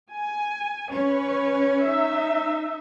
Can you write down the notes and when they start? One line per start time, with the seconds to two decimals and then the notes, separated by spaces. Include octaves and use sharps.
0.12 G#5
0.90 C#4 B4 C#5
1.83 D#4 E5